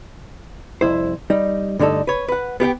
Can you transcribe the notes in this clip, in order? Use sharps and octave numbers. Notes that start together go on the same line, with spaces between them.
C2 F2 E4 C5
G3 D#4
G2 D3 A3 D#4 A4
B4 C#5
B4 F#5
B3 G4 F5 G5